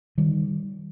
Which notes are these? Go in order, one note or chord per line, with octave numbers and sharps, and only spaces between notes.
D#3 G3